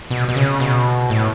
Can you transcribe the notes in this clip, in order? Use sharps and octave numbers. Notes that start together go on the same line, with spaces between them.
B2
B2
C#3
B2
A2